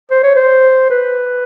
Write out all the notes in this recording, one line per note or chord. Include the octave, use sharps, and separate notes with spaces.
C5
C#5
C5
B4